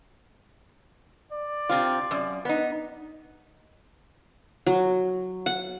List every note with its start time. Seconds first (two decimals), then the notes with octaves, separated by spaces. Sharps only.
1.32 D5
1.69 C3 C4 F4
2.11 F#2
2.45 B3 D#4
4.67 F#3
5.46 F#5